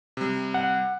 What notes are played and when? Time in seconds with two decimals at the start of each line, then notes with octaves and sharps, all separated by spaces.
0.17 C3 G3
0.54 F#5